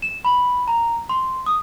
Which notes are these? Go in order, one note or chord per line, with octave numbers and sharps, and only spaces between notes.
E7
B5
A#5
C6
D#6